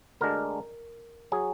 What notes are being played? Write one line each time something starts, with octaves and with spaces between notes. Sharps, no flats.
D2 D3 G#3 D4 A#4
F#3 G#4